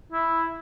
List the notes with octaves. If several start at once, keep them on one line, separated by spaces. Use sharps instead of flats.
E4